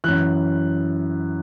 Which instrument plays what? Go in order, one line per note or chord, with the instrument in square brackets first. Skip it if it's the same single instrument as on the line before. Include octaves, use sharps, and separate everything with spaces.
[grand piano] F#2 E3 F#6